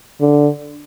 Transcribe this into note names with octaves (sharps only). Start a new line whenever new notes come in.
D3